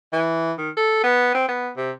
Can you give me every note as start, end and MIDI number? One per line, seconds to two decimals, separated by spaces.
0.13 0.52 52
0.58 0.70 51
0.77 1.01 69
1.04 1.30 59
1.35 1.48 60
1.48 1.70 59
1.77 1.91 48